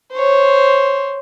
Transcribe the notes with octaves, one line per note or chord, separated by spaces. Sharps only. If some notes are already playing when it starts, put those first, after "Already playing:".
C5 C#5